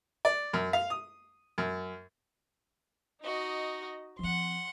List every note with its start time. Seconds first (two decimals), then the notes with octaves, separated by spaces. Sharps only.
0.25 D5
0.53 F#2
0.73 F5
0.90 D#6
1.58 F#2
3.22 D#4 F#4 D#5
4.19 F3 C4 F#5 C6